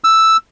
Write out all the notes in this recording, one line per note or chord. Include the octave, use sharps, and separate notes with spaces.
E6